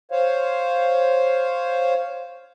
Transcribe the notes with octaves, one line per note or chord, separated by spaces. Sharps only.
C5 C#5 F5